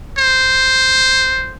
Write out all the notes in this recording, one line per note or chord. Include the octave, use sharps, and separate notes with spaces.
C5